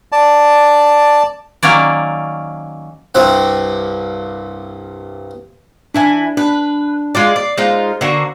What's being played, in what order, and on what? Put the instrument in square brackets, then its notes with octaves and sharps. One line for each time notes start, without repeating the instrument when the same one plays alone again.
[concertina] D5 A5
[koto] D#3 F#3 A#3 C#4 D5
[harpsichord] C2 G2 C4 F#5
[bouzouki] E3 E4 G#5 [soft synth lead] D4
[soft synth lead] D4 [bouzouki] B4
[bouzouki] G#3 F4 D5
[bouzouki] D5 [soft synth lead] C7
[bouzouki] G#3 D#4 F4 [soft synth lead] C5
[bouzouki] D3 A#3 F#4